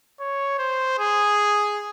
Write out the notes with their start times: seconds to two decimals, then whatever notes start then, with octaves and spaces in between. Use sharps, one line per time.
0.20 C#5
0.59 C5
0.99 G#4